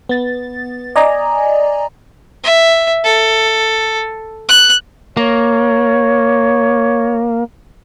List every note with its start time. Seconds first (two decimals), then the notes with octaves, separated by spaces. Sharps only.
0.09 B3 A6
0.96 D5 D#5 G#5 A#5
2.44 E5
3.05 A4
4.49 F#6
5.17 A#3 C#5